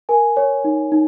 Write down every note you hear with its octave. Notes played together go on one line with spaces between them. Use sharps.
A#4 G#5
C#5
D#4
D#4